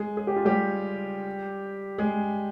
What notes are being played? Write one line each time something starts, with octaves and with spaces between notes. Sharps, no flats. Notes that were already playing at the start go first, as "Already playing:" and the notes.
Already playing: G#3 G#4
G#4
G4
F4
G3 G4
G#3 G#4